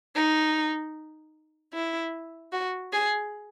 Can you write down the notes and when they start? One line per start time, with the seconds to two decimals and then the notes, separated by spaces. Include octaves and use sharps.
0.16 D#4
1.74 E4
2.52 F#4
2.92 G#4